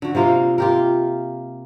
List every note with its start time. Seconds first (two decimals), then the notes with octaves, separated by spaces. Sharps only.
0.02 D3 F#4
0.15 C3 A#3 F4 A#4
0.58 F4 G4 A#4